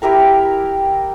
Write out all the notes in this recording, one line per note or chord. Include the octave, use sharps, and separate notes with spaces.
E4 G4 A#4 A#5